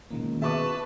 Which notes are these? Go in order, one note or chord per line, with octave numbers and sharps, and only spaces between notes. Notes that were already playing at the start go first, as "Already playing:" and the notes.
C#2 B2 D#3 A#3
B2 G#4 B4 E5 A5 C#6 D6